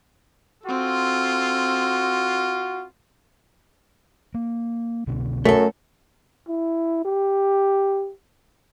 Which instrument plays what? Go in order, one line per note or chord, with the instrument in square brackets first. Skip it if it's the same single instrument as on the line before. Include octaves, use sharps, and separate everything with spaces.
[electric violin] C4 A4 [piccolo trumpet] F4 [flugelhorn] F#4
[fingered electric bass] A#3
C2 B2 D3
[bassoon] F#2 [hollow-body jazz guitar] A3 A4
[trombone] E4
G4